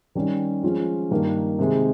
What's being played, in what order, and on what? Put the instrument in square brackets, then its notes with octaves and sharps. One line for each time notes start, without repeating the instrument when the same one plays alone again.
[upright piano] D#3 G3 C#4 G4
F3 G#3 C#4 F4
G2 D#3 A#3
C3 D#3 G#3